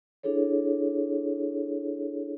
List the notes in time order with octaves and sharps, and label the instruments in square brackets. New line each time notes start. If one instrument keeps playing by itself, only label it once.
[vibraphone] D4 E4 G#4 A4 C#5